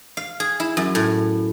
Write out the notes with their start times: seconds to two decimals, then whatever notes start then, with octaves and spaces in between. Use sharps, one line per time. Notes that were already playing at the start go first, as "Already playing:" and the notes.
0.17 F5
0.40 G#4
0.60 E4
0.77 F#2
0.95 A2